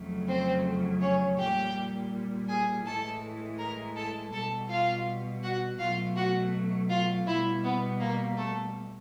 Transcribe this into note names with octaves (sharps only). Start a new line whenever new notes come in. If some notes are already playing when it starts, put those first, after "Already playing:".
Already playing: F2 C#3 F#3 A3
C4 C5
C#4 C#5
A#2 G3 G4 G5
G#4 G#5
A2 E3 G#3 A4 A5
A#4 A#5
A4 A5
B2 G3 A4 A5
F4 F5
F#4 F#5
B2 F#3 A3 F4 F5
F#4 F#5
F4 F5
B2 G3 E4 E5
B3 B4
A#3 A#4
A3 A4